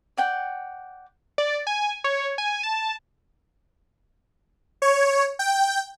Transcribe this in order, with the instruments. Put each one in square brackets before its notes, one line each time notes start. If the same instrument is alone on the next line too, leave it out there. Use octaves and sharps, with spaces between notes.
[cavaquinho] D5 F#5 G5
[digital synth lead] D5
G#5
C#5
G#5
A5
[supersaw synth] C#5
G5